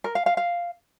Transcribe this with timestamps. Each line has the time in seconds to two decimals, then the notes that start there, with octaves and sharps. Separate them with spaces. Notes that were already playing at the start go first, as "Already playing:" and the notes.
0.04 A#4
0.15 F5
0.26 F5
0.37 F5